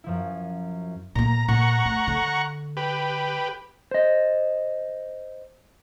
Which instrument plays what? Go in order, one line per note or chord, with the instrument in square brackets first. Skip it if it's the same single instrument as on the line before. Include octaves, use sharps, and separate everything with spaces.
[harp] F#2 F3 E4
[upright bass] A#2 A#3 [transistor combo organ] A#5
[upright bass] A#2 [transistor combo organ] F#5 A#5 C#6
[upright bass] A3
D3
[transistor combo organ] G4 B4
[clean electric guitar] C5 D#5